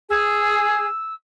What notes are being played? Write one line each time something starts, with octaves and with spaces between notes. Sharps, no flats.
G#4 E6